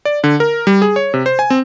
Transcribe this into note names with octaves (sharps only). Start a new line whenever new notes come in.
D5
D3
A#4
G3
G#4
C#5
C3
C5
G#5
C4